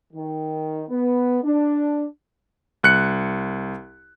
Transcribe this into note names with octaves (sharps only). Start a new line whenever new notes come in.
D#3
B3
D4
C2 F#6 C#7